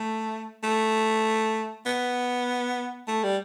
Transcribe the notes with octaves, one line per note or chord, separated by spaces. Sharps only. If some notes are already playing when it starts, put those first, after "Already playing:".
Already playing: A3
A3
B3
A3
G3